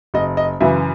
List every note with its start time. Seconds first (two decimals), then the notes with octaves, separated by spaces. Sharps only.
0.14 F#1 D#5
0.37 D#5
0.61 F#2 C#3 E3 E5